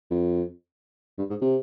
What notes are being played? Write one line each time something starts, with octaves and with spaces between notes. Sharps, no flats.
F2
G2
G#2
C3